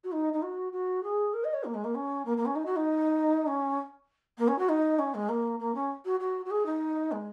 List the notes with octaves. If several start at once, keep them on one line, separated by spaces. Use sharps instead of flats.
F#4
D#4
D#4
F#4
F#4
G#4
A#4
D#5
C#5
A#3
G#3
A#3
C#4
A#3
A#3
C#4
D#4
F#4
D#4
C#4
A#3
C#4
F#4
D#4
C#4
G#3
A#3
A#3
C#4
F#4
F#4
F#4
G#4
D#4
G#3